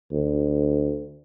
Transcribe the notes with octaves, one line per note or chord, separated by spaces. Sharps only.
D2